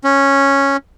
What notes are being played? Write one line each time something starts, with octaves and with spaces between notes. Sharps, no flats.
C#4